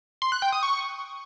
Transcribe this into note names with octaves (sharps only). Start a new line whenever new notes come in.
C6
F#6
G5
D#6
C#6